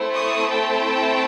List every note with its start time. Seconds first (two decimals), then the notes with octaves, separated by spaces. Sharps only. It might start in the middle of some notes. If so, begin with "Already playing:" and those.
Already playing: A3 C4 E4
0.13 C#6 D#6
0.50 G5 A5